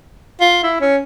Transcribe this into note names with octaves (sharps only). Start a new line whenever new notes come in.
F4
E4
C#4